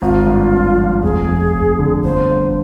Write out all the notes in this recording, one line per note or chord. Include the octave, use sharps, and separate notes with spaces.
G#1 F4
G2
G#1
F3
F1 G#4
F2
F1
D3
G1 C5
G2